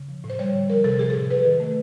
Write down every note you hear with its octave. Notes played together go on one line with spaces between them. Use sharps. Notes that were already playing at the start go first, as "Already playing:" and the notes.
Already playing: C#3
F3
A2
C5
G3 C#5
D3
F3 A#4
C3 A4
F3 G#4
A4
A2
F#3 B4
D#3
A3